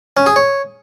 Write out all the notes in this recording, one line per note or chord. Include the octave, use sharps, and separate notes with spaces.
C#4
G#4
C#5